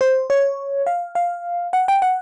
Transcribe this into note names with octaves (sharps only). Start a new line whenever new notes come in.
C5
C#5
F5
F5
F#5
G5
F#5